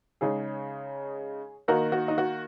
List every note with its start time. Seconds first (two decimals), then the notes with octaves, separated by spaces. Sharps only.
0.21 C#3 G#3 D#4 G#4 C#5
1.68 D#3 A#3 D#4 F#4 A#4
1.92 F#4
2.08 D#4
2.18 F#4